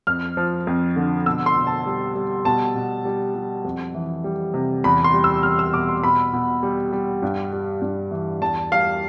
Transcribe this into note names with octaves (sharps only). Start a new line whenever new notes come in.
F2 F6
F3
F2
D3
B2 E6
C6
B2
A5
G3
G3
B2 A5
B2
G3
G3
F2
E3
G3
C3
E2 B5
C6
G3
E6
E2 F6
E6
B2 D6
C6
B2 B5
B2
G3
G3
G2
G3
G2
E3
E2 A5
G3 F5